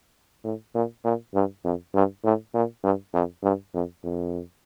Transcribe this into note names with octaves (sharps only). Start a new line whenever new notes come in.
A2
A#2
A#2
G2
F2
G2
A2
A#2
G2
F2
G2
F2
F2